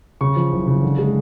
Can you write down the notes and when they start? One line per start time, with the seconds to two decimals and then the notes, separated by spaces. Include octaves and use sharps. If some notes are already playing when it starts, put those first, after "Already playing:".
0.21 C#3 C#6
0.36 F3
0.52 F#1
0.67 C#3
0.83 D3
0.99 G#3